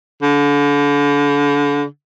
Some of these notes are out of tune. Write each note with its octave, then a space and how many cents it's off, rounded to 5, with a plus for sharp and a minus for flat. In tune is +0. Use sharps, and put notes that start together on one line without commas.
D3 -35